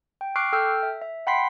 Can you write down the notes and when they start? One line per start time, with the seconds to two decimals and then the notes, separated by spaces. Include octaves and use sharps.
0.21 G5
0.36 C#6 D6 F6 F#6 C7 D7
0.53 A4 G5 E6 F6 G6
0.83 E5
1.02 E5
1.27 F#5 G5 B5 C6 B6 C7